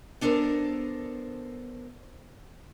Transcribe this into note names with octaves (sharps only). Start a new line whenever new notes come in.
B3 D4 A4 A#4 C5